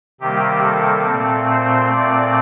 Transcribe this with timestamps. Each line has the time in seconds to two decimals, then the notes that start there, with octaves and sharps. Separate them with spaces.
0.21 C3 D#3 G3 A#3 G4
0.63 A4
1.06 A#2 A3 C4
1.50 C5
1.92 A#2 A3 C4 D5